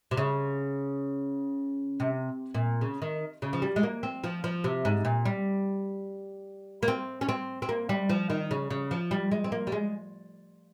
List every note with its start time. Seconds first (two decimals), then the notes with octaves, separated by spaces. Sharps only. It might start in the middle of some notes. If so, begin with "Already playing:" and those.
0.11 C3
0.17 C#3
2.00 C3
2.54 A#2
2.81 C#3
3.02 D#3
3.42 C#3
3.53 F3
3.62 G3
3.76 G#3
3.83 A#3
4.03 C4
4.24 F3
4.44 F3
4.64 C3
4.85 G#2
5.05 A#2
5.25 G3
6.83 A#3
6.88 C4
7.21 C#4
7.29 C4
7.62 C4
7.69 A#3
7.89 G3
8.09 F3
8.30 D#3
8.51 C#3
8.71 C#3
8.91 F3
9.11 G3
9.32 G#3
9.44 C4
9.52 A#3
9.67 G3
9.72 G#3